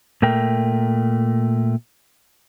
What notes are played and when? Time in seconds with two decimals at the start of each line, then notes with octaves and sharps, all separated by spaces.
0.22 A#2 A3 A#4 G5